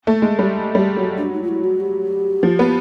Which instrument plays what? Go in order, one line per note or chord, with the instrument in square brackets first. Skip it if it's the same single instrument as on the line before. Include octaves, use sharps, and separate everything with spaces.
[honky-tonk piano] A3
G#3
G3
G3
F#3
[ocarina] D4
D#4
F4
E4
F#4
G4
[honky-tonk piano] F3
B3